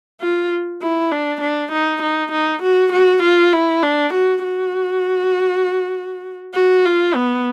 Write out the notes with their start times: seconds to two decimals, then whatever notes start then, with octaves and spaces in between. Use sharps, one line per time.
0.21 F4
0.82 E4
1.12 D4
1.41 D4
1.72 D#4
2.02 D#4
2.32 D#4
2.63 F#4
2.93 F#4
3.23 F4
3.53 E4
3.83 D4
4.14 F#4
4.44 F#4
6.54 F#4
6.85 F4
7.15 B3